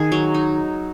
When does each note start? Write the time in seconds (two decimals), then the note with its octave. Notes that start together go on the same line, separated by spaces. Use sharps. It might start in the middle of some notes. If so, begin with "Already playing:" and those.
Already playing: D#3 D#4 G#4
0.12 F#3
0.34 D#4